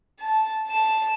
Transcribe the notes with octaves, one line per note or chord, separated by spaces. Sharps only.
A5
A5 E7